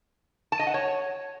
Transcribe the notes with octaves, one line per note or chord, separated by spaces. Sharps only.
A5
D#5
F#5
C#5